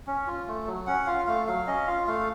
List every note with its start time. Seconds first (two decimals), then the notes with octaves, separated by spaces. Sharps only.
0.07 C#4
0.27 F4
0.47 A3
0.67 F#3
0.87 C#4 F#5
1.07 F4 F5
1.27 A3 F5
1.47 F#3 F5
1.67 C#4 D#5
1.87 F4 F5
2.07 A3 F5